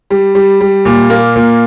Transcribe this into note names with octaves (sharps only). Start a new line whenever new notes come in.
G3
G3
G3
A#2
A#3
A#2